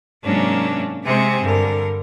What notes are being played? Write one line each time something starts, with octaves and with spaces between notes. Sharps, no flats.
G#2 C3 F#3 A#3 C#4 D4
C3 G#3 C4 G4 G#4 C5
G2 D3 A#4